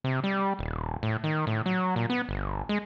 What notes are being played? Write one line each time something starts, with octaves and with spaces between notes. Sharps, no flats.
C3
G3
D#1
A2
D#3
A2
F#3
A#2
B3
G1
G#3